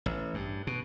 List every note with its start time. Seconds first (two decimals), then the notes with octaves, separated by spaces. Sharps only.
0.06 A1
0.34 G2
0.67 B2